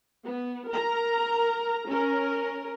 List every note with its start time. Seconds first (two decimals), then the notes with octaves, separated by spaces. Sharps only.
0.24 B3
0.69 A#4 A#5
1.87 C#4 A#4